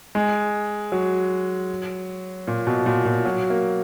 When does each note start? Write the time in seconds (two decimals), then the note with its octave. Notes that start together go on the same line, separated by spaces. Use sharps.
0.15 G#3
0.92 F#3
2.47 A#2
2.67 B2
2.86 A#2
3.05 A#2
3.25 F#3
3.50 A#3